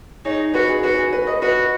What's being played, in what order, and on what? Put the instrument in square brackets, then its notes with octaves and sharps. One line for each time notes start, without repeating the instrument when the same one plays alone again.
[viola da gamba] D#4 [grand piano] G#4 C#5
[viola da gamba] F#4 [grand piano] B4
[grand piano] G#4
[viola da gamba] F#4 [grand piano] B4
[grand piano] G#4
B4
B4 D#5
[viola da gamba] F#4 [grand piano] B4 D#5